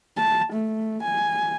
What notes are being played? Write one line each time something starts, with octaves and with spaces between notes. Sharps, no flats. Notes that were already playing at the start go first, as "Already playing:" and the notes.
A5
A3
G#5